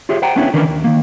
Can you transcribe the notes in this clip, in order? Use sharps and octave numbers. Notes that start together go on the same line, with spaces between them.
F4 G4 G#4 C#5 E5
C5 F#5 G5 A#5
B3 C#4 D4 E4 C#5
D#3 E3 C#4 D4 A#4 B4
D#2
D#3 A#3